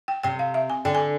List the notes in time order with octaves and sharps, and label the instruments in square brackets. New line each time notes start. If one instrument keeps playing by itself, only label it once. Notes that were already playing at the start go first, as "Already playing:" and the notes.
[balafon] G5
[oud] C3 [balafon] G5
[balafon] F5
E5
G#5
[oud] D3 [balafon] G5
[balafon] G#5